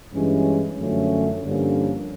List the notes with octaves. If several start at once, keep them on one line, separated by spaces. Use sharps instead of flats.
G2 E3 G#3 C#4
F#2 D3 F3 A3 C#4
G2 D3 F3 A#3 C#4